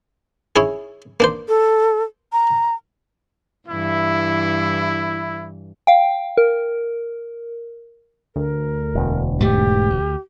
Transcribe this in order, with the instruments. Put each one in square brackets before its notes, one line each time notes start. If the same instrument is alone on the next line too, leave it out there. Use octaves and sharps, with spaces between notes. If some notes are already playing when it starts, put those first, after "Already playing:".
[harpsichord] C#4 E4 G#4
A#3 D4 C5
[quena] A4
A#5
[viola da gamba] G2 E3 [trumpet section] E4
[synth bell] F5 G5
A#4
[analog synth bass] D2 [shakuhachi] A#4
[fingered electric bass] E1
[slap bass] G#2 A3 [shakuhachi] G4
[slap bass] D2